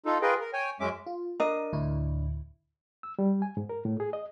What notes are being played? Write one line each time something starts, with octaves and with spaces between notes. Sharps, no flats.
D#4 F4 A4
F4 G#4 A#4 B4 D#5 G5
A#4
C#5 G5 G#5
F#2 G#3 C#4 E5 D6
F4
D4 A#4 D#5
D2 A2 E4
E6
G3
G#5
G#2
A#4
A2
G#4
D#5